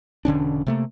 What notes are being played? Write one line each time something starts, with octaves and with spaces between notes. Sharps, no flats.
E1 D3 C#4 D4
C3 A3 A#3